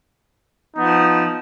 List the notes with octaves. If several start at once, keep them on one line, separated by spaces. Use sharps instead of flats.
F3 B3 D#4